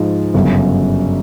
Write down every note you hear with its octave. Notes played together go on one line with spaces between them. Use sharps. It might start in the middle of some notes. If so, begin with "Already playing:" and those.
Already playing: G#2 F3 G#3
G1 F#2 C#3